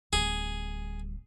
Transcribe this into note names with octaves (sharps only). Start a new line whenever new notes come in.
D1 G3 G#4